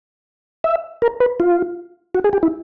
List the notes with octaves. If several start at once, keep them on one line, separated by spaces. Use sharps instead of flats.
E5
A#4
B4
F4
F#4
G#4
G4
E4